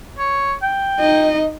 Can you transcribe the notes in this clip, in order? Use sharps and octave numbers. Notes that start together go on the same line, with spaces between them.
C#5
G5
D#4 D#5